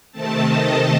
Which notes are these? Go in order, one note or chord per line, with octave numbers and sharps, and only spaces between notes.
C3 D#3 A3 C4 A5
D#5